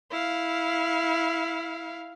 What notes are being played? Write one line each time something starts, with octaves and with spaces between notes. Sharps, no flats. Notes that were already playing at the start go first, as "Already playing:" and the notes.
E4 F5